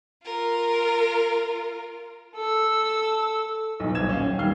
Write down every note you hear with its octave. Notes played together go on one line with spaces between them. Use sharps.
F4 A#4
A4 E6
B1 B2
D#1 D3 C5 G#6 E7
C#4 F5
G5
D#2 D#3 G3 F6 C7 G7